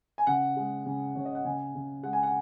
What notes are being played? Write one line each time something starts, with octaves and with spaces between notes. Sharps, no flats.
G#5
C#3 F#5
G#3
C#3
C#3 C#5
D#5
F#5
C#3 G#5
C#3
G#3 F#5
G#5
F#5